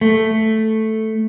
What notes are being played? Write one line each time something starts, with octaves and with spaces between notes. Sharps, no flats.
A3